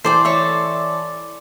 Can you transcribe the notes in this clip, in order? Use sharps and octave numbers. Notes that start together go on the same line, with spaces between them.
E3 A4 C5 D5 G5 C6
C#5 D5 E5